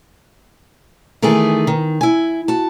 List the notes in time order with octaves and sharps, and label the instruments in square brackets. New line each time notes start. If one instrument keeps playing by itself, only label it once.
[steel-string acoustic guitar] D#3 E3 A3 B3 G#4
D#3
E4 G#5
F#4 A5